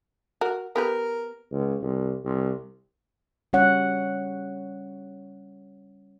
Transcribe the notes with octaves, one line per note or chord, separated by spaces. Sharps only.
F#4 A#4
B3 G4 A#4 B4
C#2
C2
C2
G3 C#4 C#5 F#5